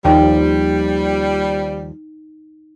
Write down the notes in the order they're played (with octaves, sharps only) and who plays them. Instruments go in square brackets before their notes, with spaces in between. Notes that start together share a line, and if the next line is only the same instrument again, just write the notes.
[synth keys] D#2 F3 [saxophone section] G3 [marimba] D#4 G5